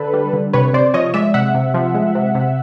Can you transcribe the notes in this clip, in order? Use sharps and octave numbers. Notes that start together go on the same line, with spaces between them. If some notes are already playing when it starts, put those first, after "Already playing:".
Already playing: D3 A4 B4
G3
D3
C3 B4 C#5
C3 C5 D5
F3 C#5 D#5
G#3 D5 E5
C3 E5 F#5
C3
F3
G#3
C3
C3